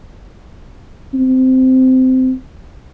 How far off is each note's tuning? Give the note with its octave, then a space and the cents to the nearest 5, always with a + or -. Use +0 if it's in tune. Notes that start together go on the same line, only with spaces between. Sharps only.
C4 -15